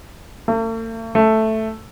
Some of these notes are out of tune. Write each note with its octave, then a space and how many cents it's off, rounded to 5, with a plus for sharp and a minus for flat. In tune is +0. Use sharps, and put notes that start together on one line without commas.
A3 +45
A3 +0